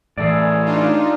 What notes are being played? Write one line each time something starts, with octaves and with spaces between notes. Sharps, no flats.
A2 E3 G#4 A4 D5
D4 D#4 F4